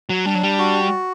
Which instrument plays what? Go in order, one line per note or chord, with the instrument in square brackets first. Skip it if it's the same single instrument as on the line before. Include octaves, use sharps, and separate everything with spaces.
[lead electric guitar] F#3
[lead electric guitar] G3 [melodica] D4
[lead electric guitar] F#3
G3
[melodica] F#4